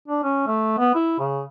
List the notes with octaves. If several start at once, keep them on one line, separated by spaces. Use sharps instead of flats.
D4
C#4
A3
B3
E4
C#3